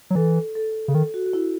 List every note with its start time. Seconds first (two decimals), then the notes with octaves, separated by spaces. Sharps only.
0.10 F#3
0.15 E3 A4
0.55 A4
0.88 C#3
0.94 D#3 A4
1.14 F#4
1.26 F#4
1.33 E4